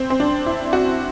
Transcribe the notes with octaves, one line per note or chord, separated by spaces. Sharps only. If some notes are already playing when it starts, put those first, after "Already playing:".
Already playing: C4
C4
D4
E4
F#4